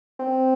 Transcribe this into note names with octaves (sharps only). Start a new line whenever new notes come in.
C4